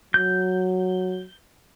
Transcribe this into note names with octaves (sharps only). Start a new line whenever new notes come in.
F#3 G6